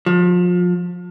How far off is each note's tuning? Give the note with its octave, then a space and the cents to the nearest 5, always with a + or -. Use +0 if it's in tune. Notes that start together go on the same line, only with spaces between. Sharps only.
F3 +30